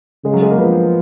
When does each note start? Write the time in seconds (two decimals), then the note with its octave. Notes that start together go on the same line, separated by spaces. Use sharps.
0.24 C#3 G#3
0.34 F#3
0.42 G#3
0.50 A#3
0.58 F3 B3